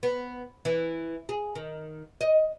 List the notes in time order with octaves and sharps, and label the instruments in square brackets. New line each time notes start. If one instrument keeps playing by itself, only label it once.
[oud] B3
E3
G#4
D#3
D#5